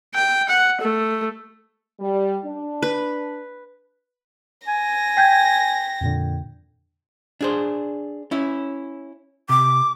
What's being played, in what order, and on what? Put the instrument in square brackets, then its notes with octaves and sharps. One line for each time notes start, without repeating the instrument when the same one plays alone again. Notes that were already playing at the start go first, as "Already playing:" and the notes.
[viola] G5
F#5
A3
[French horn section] G3
D4
[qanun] B4
[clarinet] G#5 [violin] A#6
[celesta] G5 G6 G#6 [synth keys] B6
[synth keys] F2 A#2 D3
[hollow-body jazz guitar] D4 G#4 C5
C#4 E4
[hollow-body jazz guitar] C3 [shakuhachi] D6